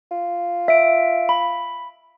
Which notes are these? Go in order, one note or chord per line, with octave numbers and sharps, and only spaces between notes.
F4
E5 D7
B5